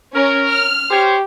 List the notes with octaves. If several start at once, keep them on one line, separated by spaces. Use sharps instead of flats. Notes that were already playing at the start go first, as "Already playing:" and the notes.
C#4 A#4
F6
G4 C5 C#5